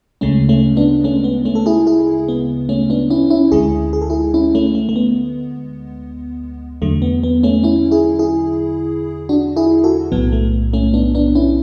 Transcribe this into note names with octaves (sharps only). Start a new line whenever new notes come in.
D2 C#3 G#3 A3 C#4
A3 C#4
B3 D4
A3 C#4
B3
A3 C#4
A4
E4 G#4
E4 G#4
B3
A3 C#4
B3 D4
C#4 E4
C#4 E4
D2 D3 G#3 E4 G#4
G#4
A4
E4 G#4
C#4 E4
A3 C#4
A3
A3
B3
E2 D3 F#3 A3
B3
B3
A3 C#4
C#4 E4
E4 G#4
E4 G#4
D4 F#4
E4 G#4
F#4 A4
B1 A2 F#3 B3
A3
A3 C#4
B3 D4
B3 D4
C#4 E4